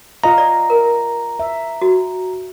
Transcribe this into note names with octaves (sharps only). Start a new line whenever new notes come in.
F4 D#5 F5 A#5
D5
A#4
E5
F#4